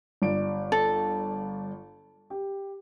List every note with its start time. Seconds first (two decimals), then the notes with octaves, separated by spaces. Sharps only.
0.22 G1 D5 D7
0.72 A4
2.30 G4